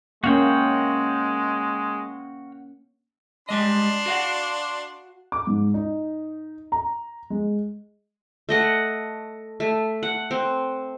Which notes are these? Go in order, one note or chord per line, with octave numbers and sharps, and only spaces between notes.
G#3 A#3 C#4 F#4 F5 G5
G3 G#3 D4 D#5 C6
F#4 F5 F#5
D6
G#2
D#4
A#5
G#3
A3 D#5 F#5
A3
F#5
C4